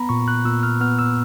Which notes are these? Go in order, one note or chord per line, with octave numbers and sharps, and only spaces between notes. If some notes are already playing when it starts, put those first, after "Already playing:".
Already playing: B3 A#5 B5
A#2 C#6
F#6
A#2 E6
F6
B3 F6
E6